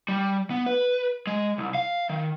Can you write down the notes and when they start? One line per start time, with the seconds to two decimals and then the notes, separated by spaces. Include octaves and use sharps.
0.08 G3
0.50 B3
0.66 B4
1.27 G#3
1.58 C2
1.75 F5
2.09 D#3